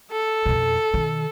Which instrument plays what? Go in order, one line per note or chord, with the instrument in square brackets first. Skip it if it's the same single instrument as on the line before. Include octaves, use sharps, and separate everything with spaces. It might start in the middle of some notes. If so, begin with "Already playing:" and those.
[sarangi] A4
[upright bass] F2 B2
B2 D#3